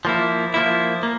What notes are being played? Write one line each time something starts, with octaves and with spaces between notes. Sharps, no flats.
F3 A#3 E4
F3 A#3 E4
A#3